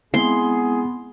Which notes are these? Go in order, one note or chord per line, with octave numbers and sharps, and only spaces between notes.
G#3 B3 C4 E4 G#4 C6